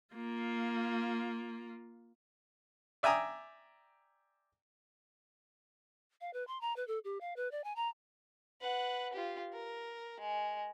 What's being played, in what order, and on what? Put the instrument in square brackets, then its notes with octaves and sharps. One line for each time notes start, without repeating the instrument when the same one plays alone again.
[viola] A#3 F4
[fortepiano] D5 E5 G5 G#5 A#5 D#6
[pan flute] F5
B4
C6
A#5
B4
A4
G4
F5
B4
D5
G#5
A#5
[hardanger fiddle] B4 F#5
F4 G4
A#4
G#3